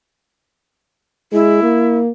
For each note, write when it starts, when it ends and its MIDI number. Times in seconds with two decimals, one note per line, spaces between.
1.33 1.62 56
1.33 1.97 64
1.63 2.11 58